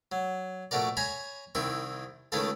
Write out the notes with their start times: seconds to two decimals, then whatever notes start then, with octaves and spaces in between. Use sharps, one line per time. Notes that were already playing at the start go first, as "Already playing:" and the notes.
0.12 F#3
0.71 A#1 A3 F#4 A#4 D5
0.97 C#5 G#5 A#5 B5 C#6
1.55 C2 D#3 C4 E4 C#6
2.32 C#2 D#3 A3 E4 F4 A4